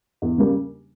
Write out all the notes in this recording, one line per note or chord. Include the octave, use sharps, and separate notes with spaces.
E2
C#3 G3 A#3